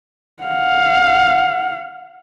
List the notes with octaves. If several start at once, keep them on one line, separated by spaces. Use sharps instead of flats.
F5 F#5